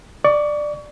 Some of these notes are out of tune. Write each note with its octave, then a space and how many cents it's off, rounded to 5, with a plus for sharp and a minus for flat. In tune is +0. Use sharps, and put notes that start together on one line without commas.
D5 +15 C#6 +30